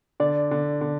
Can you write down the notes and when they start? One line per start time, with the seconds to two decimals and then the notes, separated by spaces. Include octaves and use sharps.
0.20 D3 D5
0.51 D3
0.81 D3